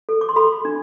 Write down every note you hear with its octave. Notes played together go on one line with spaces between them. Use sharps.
A4
D6
C6
A4 B5
D4